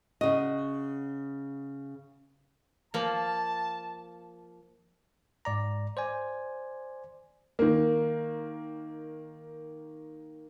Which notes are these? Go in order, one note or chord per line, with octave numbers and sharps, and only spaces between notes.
C#3 F#4 D#5
F3 A#3 A5
G#2 D5 A#5
C5 D5 G#5
D#3 A#3